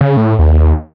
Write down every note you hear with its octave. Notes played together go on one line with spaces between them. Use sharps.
C#3
A2
D#2